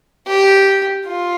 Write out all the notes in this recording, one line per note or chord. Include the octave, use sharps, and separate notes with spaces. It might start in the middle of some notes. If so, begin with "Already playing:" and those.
G4
F4